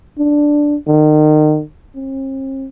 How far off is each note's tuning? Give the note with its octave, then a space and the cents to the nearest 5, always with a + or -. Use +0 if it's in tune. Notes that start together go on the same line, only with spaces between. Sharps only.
D4 +0
D#3 -30
C4 +45